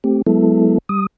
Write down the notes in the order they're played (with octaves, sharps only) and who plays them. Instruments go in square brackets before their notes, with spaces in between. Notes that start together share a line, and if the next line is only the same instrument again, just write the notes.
[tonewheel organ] A3 C4 G4
F#3 G#3 B3 E4 A4
G3 D#6